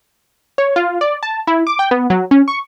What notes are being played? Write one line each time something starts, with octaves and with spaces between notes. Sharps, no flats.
C#5
F4
D5
A5
E4
D6
G5
B3
F#3
C#4
C#6